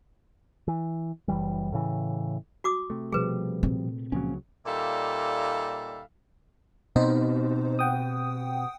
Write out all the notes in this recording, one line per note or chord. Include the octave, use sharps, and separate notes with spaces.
E3
F#1 E3 G3
A2 C#3 E3
F#4 D6 D#6
C3 A3
B2 F3 G3 G#4 B4
A#2 C4
C#2 C#3 F3 F#3 A#3 C#4
A#2 G3 D#4 A4 E5 F5
B2 B3 C4 D#4 C5
F#5 G5 D#6